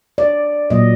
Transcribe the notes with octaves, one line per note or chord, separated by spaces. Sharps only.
D5
A#2 F#3 A#3 D#5